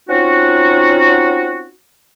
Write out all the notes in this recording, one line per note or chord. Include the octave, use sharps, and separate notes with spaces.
C4 C#4 D#4 F4 F#4